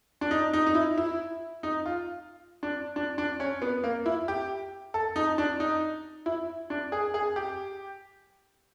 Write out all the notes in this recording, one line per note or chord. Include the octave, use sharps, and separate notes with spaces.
D4
D#4
D#4
D#4
E4
E4
D#4
F4
D4
D4
D4
C#4
B3
A#3
E4
G4
A4
D#4
D4
D#4
E4
D4
G#4
G#4
G4